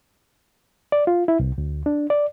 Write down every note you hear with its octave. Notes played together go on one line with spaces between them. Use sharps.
D5
F4
E4
C2
D2
D4
D5